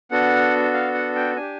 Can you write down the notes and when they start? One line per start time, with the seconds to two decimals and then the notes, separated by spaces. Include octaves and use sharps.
0.11 B3 D4 F#4 A4 F#5
0.74 F5
0.94 F#5
1.16 G5
1.36 D4 G4 G#5